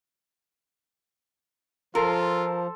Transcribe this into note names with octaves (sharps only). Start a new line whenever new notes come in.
F3 F4 A4 A#4 C6